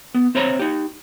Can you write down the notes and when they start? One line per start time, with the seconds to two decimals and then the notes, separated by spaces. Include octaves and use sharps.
0.14 B3
0.35 C4 C5 C#5 E5 A#5 B5
0.59 D#4 G4